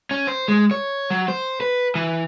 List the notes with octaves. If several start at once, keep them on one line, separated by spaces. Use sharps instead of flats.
C#4
C5
G#3
C#5
F#3
C5
B4
E3